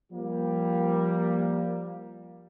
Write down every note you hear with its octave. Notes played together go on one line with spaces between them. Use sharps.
F3 G3 A#3